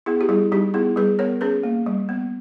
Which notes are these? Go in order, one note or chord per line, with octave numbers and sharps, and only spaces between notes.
B3 E4 G#4
G4
G3 E4 G#4
G3 D#4 G4
B3 E4 G#4
G3 G#4 B4
B3 A#4 C#5
C#4 G#4 B4
A#3
G3
B3